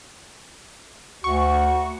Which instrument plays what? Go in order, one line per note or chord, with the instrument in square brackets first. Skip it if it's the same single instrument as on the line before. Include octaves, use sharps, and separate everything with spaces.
[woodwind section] D2 [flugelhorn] F#4 [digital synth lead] C#6